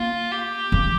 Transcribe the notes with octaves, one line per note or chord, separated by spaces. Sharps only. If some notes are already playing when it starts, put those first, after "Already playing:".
Already playing: A#3 F4
G4
F3